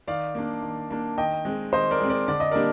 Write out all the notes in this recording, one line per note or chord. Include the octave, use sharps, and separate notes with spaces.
D#3 D5 F5
A#3 D4
D#3
A#3 D4
D#3 D#5 G5
G#3 C4
D#3 C5 D#5
A#4 D5
G#3 C4
A#4 D5
D3 D5
D#5
G3 A#3 D4 A#4 D5